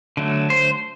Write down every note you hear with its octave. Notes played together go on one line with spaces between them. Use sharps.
D3 F#3 A3
C5